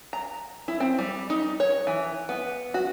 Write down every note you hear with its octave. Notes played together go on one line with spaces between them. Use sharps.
A#5
E4
C4
G3
D#4
C#5
E3
B3
F#4